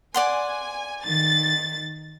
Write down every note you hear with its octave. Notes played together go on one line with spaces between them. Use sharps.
D5 F#5 G#5 C6
D#3 A6